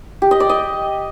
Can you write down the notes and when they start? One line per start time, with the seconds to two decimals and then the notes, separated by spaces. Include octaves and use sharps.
0.22 G4
0.31 D#5
0.40 D5
0.49 D#5